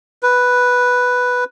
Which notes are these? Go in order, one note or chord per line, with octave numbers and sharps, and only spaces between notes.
B4